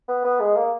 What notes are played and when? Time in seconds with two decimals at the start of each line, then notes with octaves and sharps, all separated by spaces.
0.08 B3
0.25 B3
0.40 G#3
0.57 A#3